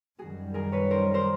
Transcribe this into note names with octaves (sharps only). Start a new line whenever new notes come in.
F#2 D#3 G3 F#4 G#4
G#4 A#4
B4 C#5
A#4 C5
A#4 C5